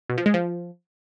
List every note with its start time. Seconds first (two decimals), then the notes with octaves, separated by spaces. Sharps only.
0.09 B2
0.18 F3
0.26 G#3
0.34 F3